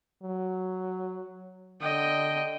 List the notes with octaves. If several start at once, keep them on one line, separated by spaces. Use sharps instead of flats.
F#3
D3 D#5 G5